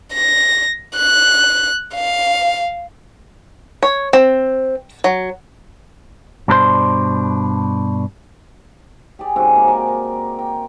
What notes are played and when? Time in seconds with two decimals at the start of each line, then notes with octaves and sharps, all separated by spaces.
0.13 A#6
0.96 F#6
1.94 F5
3.83 C#5
4.13 C4
5.04 F#3
6.48 G2 B2 D4 E4 C5 C6
9.19 G4 G#4 D5
9.36 G#2 C#3 C4 F#4
9.56 A#3 A#4 D6
9.67 A#4 C5 D5 G#5
9.88 A#4
10.39 A#4 G5